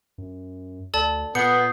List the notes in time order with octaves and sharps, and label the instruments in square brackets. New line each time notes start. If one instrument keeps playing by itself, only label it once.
[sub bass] F#2
[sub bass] D2 [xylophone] A4 D5 A5
[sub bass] A#2 [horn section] B3 [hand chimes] D#6 G6 C7 [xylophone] C#7